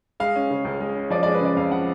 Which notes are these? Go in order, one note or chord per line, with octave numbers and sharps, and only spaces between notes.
G#3 F5
C#4
C#3
C#2
G#3
C#4
F3 D5
G#3 D5
B4
C#3 D5
F2 F5
F3 F#5